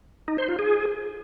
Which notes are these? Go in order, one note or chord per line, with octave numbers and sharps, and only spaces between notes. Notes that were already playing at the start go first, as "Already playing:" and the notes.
D#4
C5
F4
G#4